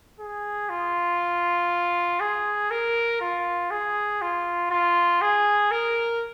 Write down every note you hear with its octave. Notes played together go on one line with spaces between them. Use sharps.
G#4
F4
G#4
A#4
F4
G#4
F4
F4
G#4
A#4